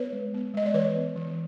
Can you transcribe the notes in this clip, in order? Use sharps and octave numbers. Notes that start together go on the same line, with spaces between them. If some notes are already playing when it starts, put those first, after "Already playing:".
Already playing: B3 B4 C#5
G#3
B3
G#3 D#5
D5
E3 B4 C#5
B3
E3